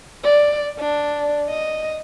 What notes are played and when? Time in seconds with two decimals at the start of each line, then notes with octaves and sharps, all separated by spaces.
0.24 D5
0.79 D4
1.49 D#5